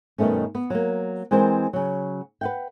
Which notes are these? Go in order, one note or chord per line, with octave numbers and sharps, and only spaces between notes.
G2 B2 D#3 A3 C#4
B3
F#3 A#3
E3 G#3 C4 A#4 C5
C#3 F#3
B4 F#5 G5